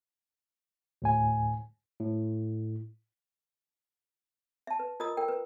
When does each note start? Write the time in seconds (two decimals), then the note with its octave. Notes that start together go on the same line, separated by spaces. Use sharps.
1.02 D2 A2 G#5
2.00 A2
4.67 E5 A5
4.79 B4
5.00 F4 A#4 D#5 A#5 D#6
5.17 A#4 G5
5.28 B4